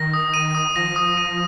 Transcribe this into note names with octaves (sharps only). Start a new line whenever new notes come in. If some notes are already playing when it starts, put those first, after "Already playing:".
Already playing: D#3 A#6
D#6
D#7
D#6
F3 A#6
D#6
D#7